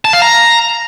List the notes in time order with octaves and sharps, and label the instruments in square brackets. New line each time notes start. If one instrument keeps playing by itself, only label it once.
[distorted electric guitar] A5
F5
A#5